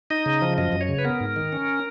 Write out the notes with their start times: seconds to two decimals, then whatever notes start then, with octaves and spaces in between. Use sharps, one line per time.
0.10 D#4 D#5
0.26 C#3
0.42 F3
0.58 F#2 D#5
0.73 F#2
0.81 C#5
0.89 C#3
0.98 B4
1.04 B3 A#4
1.20 G#2
1.36 D#3
1.52 C#4